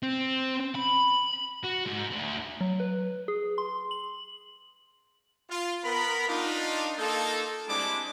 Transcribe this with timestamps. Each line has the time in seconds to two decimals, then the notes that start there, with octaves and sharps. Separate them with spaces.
0.03 C4
0.75 B5
1.64 F#4
1.87 G#2
2.11 D2
2.61 F#3
2.80 B4
3.28 G#4
3.58 C6
3.91 F#7
5.49 F4
5.83 B3 A#4 B5
6.28 D4 D#4 F4
6.98 A#3 D#4 F4 A4
7.68 G3 G#3 C4 D4 E4 D6